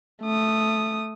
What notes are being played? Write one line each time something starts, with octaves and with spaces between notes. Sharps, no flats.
A3 D#6